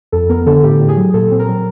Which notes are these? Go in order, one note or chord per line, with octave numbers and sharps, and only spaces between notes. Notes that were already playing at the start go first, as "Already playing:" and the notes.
F2 A4
B3 A#4
D3 A4
A2 G4
A2
G#4
F#3
A#2 A4
C4
A#4
F#3